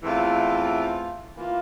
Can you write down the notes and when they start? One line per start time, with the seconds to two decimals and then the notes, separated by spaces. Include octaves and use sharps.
0.03 E2 E3 A3 C4 F4
1.35 E3 A#3 F4